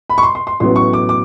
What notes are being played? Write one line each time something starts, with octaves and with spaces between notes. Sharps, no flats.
B5
C#6
C6
C6
C6
A1 A2 F#3 B3 C6
C#6
D6
D6